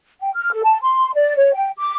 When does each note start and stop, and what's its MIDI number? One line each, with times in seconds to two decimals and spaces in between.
0.20 0.30 79
0.35 0.52 89
0.52 0.62 69
0.64 0.78 81
0.82 1.12 84
1.14 1.36 74
1.36 1.52 73
1.54 1.70 79
1.78 1.96 86